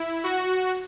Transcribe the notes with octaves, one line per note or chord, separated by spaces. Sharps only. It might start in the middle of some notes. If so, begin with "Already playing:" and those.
Already playing: E4
F#4